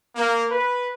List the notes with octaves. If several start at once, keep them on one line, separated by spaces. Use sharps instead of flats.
A#3
B4